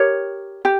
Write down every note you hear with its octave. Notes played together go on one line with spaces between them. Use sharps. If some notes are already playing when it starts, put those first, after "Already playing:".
Already playing: G4 A#4 C#5
G4